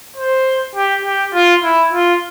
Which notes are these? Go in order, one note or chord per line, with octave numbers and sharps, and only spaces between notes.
C5
G4
G4
F4
E4
F4